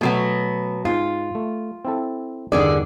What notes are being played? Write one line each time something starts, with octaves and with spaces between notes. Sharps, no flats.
B2 F#3 A3 B3
G#2 F4 G#5
A3
C4 E4 A4
E2 G2 D3 D#3 G#4 D5